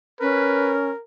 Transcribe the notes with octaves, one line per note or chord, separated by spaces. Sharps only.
C#4 A#4 B4